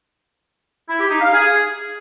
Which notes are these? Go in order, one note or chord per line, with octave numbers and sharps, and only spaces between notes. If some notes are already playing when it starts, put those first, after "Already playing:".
E4
G4
D#4
F5
G#4